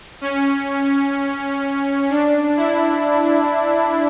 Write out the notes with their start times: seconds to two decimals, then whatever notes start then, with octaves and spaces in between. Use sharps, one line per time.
0.21 C#4
2.10 D4
2.57 E4